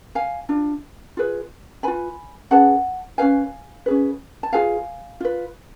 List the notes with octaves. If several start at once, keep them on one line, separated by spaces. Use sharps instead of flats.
F5 G#5
D4 F4
F4 G#4 B4
F4 B4 G#5 B5
C#4 G#4 B4 F#5 A5
C#4 G#4 B4 F5 G#5
C#4 G#4 B4
A5
F4 G#4 B4 F5 G#5
F4 B4